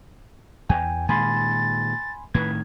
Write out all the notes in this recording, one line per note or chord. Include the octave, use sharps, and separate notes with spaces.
E2 G5 G#5
A#2 D#3 G#3 G#5 B5 C6 A6
A2 D#3 B4 G#6